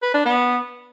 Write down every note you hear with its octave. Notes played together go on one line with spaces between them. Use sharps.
B4
D4
B3